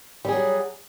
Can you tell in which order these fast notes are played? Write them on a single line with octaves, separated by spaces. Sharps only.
G3 G#4 F#3